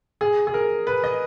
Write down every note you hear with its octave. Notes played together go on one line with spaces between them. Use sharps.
G#4
G#4
A#4
B4
D#5